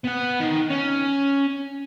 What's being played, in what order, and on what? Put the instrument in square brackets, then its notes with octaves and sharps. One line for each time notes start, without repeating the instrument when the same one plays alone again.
[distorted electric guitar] B3 F#5
D#3
C#4